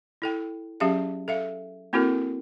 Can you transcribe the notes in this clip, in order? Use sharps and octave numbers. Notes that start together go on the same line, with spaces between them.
E4 A4 G5
F#3 C#4 G4 G#4 E5 F5
A4 E5 F5
A#3 C4 E4 F#4 A4 A#4